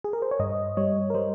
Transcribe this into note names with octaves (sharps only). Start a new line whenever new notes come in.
G#4
A#4
C5
C#5
G2 D#5
G3 C#5
A#4
G3 C5